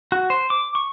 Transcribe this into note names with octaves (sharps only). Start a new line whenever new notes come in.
F#4
C5
D6
C#6